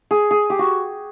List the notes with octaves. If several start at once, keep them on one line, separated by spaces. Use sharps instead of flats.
G#4
G#4
G4
F#4